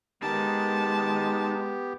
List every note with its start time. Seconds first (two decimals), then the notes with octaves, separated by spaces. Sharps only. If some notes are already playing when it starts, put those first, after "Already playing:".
0.22 G#3 B3 D#4 G4 A#4 A5